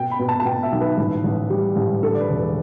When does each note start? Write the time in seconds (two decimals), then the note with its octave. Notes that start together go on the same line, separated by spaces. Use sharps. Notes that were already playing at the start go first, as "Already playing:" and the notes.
Already playing: B2 G5
0.11 B5
0.19 B2
0.28 A5
0.40 A5
0.46 B2 G5
0.63 E5
0.72 B1
0.81 B4
0.98 A1
1.24 A1
1.50 G3
1.76 A1
2.03 D3 A4
2.15 D5
2.20 B4
2.29 E1
2.38 B4